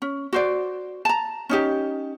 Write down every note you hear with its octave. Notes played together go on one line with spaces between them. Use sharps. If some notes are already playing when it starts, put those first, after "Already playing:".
C#4
F#4 C5 D5
A5 A#5
C#4 D#4 G4